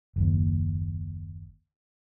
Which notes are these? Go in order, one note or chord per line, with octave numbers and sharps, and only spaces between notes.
F#1 D#2